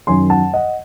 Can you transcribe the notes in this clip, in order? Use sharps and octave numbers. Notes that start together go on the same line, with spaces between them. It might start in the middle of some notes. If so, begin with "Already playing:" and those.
F#2 D#3 F#3 G#5 C6
F#5 A5
D#5 F#5